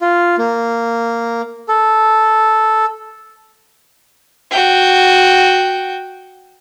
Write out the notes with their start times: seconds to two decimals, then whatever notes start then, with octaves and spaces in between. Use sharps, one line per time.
0.01 F4
0.38 A#3
1.68 A4
4.51 F#4 G5